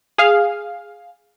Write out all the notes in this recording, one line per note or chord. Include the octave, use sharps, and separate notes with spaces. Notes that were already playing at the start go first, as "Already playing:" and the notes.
G#4 F5